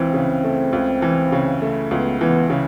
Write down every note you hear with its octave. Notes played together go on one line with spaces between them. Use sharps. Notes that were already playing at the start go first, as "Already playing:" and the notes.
Already playing: C#2 E3 C4
C#3
A3
C#2
E3
C#3
A3
C#2 B3
E3 B3
C#3